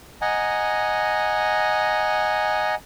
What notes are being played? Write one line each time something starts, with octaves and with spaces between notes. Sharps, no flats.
D#5 F#5 G#5 A#5